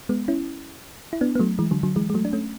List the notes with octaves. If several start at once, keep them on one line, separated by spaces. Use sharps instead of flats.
G#3 B3
C#4 E4
E4
B3 D4
B3
F#3 A3
E3 G#3
D3 F#3
D3 F#3
E3 G#3
G#3
F#3 A3
D4
A3 C#4